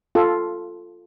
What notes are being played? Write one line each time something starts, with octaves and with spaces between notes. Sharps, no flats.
F4 A4